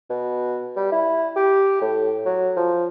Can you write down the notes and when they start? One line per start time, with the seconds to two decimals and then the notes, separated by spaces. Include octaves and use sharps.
0.10 B2
0.76 G3
0.92 E4
1.36 G4
1.81 A2
2.25 F#3
2.57 F3